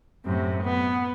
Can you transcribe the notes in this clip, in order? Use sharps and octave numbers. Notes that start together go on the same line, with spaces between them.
F#2 A2 C3
B3